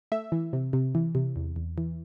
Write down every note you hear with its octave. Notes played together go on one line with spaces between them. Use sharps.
A3 E5
E3
C3
C3
E3
C3
E2
E2
E3